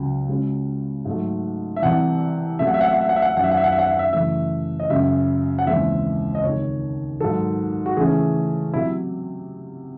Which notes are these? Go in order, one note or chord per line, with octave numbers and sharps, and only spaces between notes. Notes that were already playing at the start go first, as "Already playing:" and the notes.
Already playing: C#2 C#3 F#3
C#3 G#3 C#4 F#4
G#2 F#3 A3
E5
C2 C3 E3 F#5
C3 F#3 A3 C#4 E5
F#5
E5
F#5
E5
F#5
E5
F#5
E5
F#5
E5
F#2 D#3 F#3 F#5
E5
F#5
E5
F#5
E5
F#5
E5
F#5
E5
F#2 C#3 E3 A3 E5
D#5
F#2 C#3 F#3 E5
F#5
D#2 C#3 E3 G#3 C4 E5
D#5
C#2 C3 D#3 C#5
G#2 D#3 F#3 A4
F#4
C#3 E3 A3 C#4 G#4
C3 F#3 E4